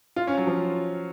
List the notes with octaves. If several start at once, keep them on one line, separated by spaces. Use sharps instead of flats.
F4
C#4
F#3
F3